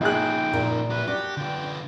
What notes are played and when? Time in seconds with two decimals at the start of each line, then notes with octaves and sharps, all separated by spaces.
0.01 A#1 F3 D#4 G#4 G5 F#6
0.53 A#2 A#4
0.91 E4 G4 B4
1.08 D4 F#4 G4
1.37 D3 F4 G5